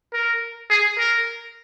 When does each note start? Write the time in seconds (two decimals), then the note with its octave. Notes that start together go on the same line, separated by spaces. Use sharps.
0.14 A#4
0.70 G#4
0.98 A#4